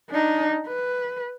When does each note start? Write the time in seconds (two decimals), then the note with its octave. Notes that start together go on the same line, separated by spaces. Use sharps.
0.10 D4 D#4
0.66 B4